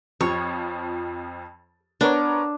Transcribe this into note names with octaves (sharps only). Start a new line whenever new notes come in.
F2 F3 C#5
B3 D4 A#4 C#5